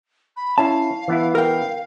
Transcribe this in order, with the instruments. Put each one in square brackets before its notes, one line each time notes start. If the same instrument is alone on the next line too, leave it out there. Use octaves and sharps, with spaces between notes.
[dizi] B5
[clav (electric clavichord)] C#4 E4 [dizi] F5 [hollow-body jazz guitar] A5
[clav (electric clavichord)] E3 B3 E4
[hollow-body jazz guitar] A#4 G5 [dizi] F5